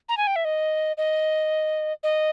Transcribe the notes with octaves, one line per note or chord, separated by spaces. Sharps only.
A#5
G#5
G5
E5
D#5
D#5
D#5